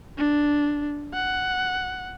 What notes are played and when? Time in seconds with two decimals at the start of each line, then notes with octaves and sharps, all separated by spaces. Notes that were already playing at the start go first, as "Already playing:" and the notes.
0.18 D4
1.14 F#5